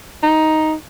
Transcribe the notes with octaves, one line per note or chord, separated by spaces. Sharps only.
D#4